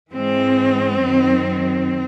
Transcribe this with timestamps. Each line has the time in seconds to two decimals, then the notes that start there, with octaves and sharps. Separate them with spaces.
0.11 G#2 E3 G#3 C4
1.00 F#2 D#3 F#3